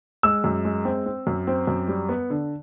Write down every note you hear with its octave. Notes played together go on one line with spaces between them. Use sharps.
G#3 E6
F#2
G#3
C4
C4
F#2
C4
F#2
G3
B3
D3